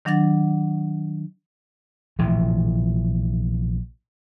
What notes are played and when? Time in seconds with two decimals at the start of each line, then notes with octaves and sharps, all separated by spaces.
0.05 D#3 F#3 D4 F#5 A6
2.19 A#1 A2 C3 E3